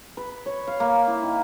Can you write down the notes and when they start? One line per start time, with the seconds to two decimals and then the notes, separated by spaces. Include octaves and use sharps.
0.17 B4
0.46 C#5
0.67 F5
0.80 A#3
1.07 E4
1.23 D#3